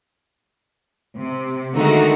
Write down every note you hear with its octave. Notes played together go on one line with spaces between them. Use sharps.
C3
D3 D#3 G#3 A3 D#4 F#4